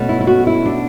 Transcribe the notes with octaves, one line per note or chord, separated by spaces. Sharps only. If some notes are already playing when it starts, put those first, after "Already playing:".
Already playing: B2 A3 C#4
E4
E4
F#4
E4
D4